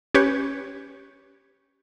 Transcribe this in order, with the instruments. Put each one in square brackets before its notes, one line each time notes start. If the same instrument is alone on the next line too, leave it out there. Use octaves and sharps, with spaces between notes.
[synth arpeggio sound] C#4 G4 B4 C#5